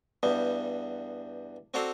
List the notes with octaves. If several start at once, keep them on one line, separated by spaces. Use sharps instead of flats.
E2 G2 G3 B3
C4 F#4 A4 D5 A#5 C6